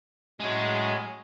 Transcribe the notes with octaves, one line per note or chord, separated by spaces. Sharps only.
A2 F#3 G#3 C#4